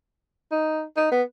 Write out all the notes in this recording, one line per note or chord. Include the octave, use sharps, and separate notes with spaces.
D#4
D#4
B3